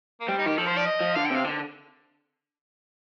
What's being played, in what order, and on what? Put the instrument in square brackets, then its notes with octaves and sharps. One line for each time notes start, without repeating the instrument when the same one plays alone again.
[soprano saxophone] A#3
[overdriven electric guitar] G3 [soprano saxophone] C4
[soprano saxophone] D#4
[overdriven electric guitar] D#3 [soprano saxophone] G4
[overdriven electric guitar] F3 [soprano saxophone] A4
[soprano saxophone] C5
D5
D#5
[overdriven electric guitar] F3
[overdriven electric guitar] D3 [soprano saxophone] F5
[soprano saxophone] G5
[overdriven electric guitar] C3 [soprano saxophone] F5
[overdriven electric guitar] D3